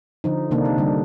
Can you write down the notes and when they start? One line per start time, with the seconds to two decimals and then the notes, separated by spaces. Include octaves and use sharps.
0.24 D3 F3 D#4
0.51 C3 D#3 A#3 D4 D#4
0.65 D#4
0.78 D3 G3